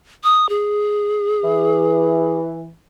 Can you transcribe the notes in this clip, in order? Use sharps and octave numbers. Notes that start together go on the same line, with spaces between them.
D#6
G#4
E3